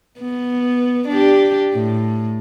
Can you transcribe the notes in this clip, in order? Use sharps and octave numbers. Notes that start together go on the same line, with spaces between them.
B3
D4 G4
A2